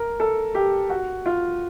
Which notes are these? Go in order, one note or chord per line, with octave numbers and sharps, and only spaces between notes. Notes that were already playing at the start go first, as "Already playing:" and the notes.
Already playing: A#4
A4
G4
F#4
F4